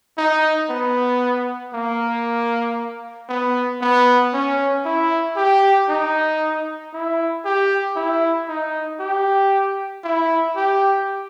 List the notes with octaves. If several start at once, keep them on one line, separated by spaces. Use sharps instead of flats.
D#4
B3
A#3
B3
B3
C#4
E4
G4
D#4
E4
G4
E4
D#4
G4
E4
G4